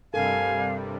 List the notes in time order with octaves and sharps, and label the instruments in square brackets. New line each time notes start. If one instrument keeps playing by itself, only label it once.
[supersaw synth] G2 C3 G3 [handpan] A4 A#4 [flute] F5 [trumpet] G#5